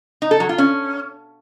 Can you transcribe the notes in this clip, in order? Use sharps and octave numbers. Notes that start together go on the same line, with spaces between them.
D#4
A4
F#3
F4
C#4